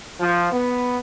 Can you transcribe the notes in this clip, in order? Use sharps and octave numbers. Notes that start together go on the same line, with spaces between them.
F3
B3